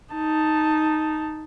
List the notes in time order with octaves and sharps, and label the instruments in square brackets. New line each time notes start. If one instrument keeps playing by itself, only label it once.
[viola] D#4 A5